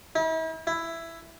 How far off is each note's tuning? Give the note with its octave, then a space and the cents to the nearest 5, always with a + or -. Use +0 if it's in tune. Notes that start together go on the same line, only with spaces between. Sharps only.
E4 -40
E4 +10